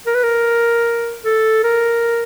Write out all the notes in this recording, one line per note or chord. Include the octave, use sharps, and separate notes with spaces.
A#4
B4
A#4
A4
A#4